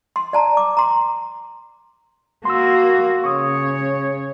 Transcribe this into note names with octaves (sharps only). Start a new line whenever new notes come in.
C6
D5 A5 A#5
D6
A#5 C6
A#3 F#4 C6 E6
C#3 C#5 C#6 D#6